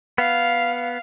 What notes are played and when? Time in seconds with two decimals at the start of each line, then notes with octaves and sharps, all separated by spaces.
0.18 B3 F5